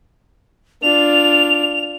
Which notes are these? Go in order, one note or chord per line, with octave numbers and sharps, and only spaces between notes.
D4 F4 F7